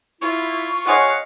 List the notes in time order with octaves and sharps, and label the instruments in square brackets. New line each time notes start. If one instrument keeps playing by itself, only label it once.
[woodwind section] E4 [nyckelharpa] F4 [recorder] C#6
[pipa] F4 G#4 C#5 [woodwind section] D#5 F#5 [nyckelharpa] F5